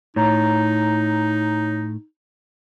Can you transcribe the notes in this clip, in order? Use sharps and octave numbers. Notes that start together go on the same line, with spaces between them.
A2 D#4 C#5 A#5